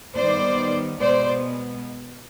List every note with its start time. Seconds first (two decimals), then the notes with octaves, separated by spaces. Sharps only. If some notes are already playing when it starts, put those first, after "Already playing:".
0.15 D#3 G3 B3 C5 D5
0.97 B2 G#3 B3 C5 D5